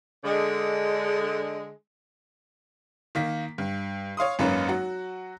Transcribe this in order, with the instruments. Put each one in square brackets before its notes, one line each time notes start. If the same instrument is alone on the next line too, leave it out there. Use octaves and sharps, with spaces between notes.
[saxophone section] D3 G#3
[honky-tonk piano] D#3 A#3 B6
G2
C#5 F5 C6 D#6
G#1 F#2 A#3 C#4 B4 E7
F#3 F#4